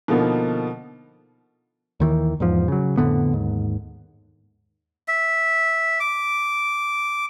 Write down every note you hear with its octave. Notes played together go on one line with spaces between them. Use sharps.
B2 D3 F3 A#3 B3 D#4
D#2 D#3 E3
E2 G#2 F3
C#3 F#3
F2 A2 D3 B3
D#2 G#2
E5
D6